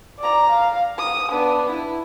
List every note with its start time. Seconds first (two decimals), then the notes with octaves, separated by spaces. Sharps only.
0.19 D5 A#5
0.50 F5
0.98 D#6
1.31 B3 D4
1.70 E4